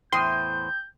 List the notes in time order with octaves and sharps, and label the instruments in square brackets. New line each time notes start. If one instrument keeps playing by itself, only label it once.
[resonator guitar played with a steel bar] E2 A2 C5 [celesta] G5 D#6 D#7 [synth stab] C6 [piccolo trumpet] G6